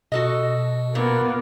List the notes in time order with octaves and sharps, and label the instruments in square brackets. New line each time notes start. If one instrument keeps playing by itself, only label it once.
[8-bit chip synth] B2 [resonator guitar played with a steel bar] F#4 A4 D#5
[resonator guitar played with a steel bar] A#2 [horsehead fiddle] A#3 B3